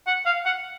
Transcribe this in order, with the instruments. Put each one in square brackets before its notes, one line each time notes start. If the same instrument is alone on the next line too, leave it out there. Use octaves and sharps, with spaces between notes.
[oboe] F#5
F5
F#5